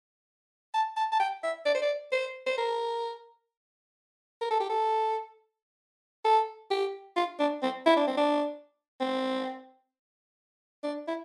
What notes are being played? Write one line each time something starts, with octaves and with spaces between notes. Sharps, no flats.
A5
A5
A5
G5
E5
D5
C5
D5
C5
C5
A#4
A#4
A4
G4
A4
A4
G4
F4
D4
C4
E4
D4
C4
D4
C4
D4
E4